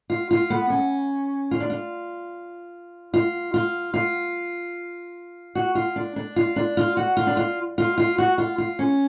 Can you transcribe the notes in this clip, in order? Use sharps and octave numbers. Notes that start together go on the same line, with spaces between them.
F4
F4
B3
C#4
F4
D4
F4
F4
F4
F4
F#4
F4
D4
D4
F4
D4
F4
F#4
F4
D4
F4
F4
F4
F#4
F4
F4
C#4